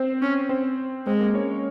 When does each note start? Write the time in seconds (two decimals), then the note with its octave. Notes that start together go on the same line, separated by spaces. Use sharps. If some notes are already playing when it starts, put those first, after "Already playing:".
Already playing: C4 C5
0.22 C#4
0.49 C4 C5
1.06 G#3 C4 C5
1.21 A#3 A#4
1.35 C#4 C#5